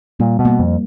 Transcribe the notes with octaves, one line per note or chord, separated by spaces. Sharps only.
A#2 G3
B2
A#3
F2